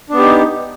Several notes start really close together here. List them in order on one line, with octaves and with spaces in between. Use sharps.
D4 B3 G4 D#4